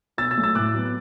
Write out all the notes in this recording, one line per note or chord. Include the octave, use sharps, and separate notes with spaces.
B2 E6 A6
E6 A6
F#3 A3
E6 A6
A2 D6 F#6
F#3 B3